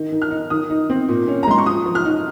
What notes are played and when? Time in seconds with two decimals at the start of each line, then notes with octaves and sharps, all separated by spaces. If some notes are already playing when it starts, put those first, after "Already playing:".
Already playing: D#3 D#4
0.12 D#3
0.22 F6
0.31 D#4
0.50 D#3 D#6
0.70 D#4
0.90 C4
1.09 A#2
1.28 C#4
1.43 A#5
1.48 G#3 C6
1.58 C#6
1.66 F3 D#6
1.86 F3
1.95 F6
2.05 D#4